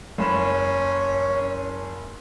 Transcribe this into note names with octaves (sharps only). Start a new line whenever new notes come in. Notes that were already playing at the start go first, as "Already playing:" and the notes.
F#1 C#4 B5 E7